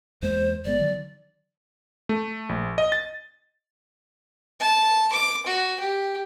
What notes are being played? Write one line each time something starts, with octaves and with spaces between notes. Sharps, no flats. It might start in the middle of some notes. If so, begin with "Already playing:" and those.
E2 G#3 A#3 C5
G1 G#3 B3 D5
D3 D#3 F#3
A3
A#1
D#5
A6
A5
D6
F#4
G4